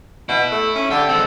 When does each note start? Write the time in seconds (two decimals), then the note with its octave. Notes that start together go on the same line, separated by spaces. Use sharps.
0.29 B2 E4
0.52 A3
0.75 C#4
0.91 D3 G4
1.09 G#3 C4 A4